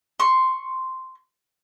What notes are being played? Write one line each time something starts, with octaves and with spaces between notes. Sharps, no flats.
C6 C#6